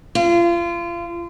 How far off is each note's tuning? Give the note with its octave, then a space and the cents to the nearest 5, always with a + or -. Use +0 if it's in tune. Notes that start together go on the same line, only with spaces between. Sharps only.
F4 -30